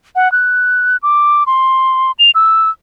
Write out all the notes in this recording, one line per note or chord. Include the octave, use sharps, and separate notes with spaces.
F#5
F#6
D6
C6
F7
E6